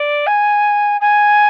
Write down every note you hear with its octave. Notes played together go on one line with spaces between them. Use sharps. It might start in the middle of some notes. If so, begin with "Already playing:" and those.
Already playing: D5
G#5
G#5